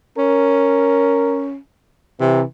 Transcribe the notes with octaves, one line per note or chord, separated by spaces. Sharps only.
C#4 A#4
C3 E3